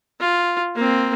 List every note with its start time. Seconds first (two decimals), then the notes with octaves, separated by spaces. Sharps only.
0.21 F4
0.75 A#3 C4